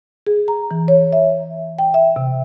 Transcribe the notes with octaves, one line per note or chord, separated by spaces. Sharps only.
G#4
A#5
E3
C#5
E5
G5
E5
C3